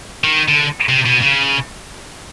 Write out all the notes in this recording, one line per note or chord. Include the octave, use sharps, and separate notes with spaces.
D#3
D3
C3
B2
C#3